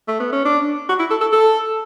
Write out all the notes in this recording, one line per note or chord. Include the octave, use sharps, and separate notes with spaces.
A3
B3
C#4
D4
F#4
E4
A4
A4
A4